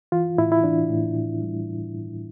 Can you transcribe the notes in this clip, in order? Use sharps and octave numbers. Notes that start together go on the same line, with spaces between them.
E3 F4
A2 E4
E4
E3 D4
A2
A2
G3